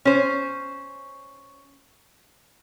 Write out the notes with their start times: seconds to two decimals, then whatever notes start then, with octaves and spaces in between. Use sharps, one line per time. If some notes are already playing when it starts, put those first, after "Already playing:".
0.05 C#4 C5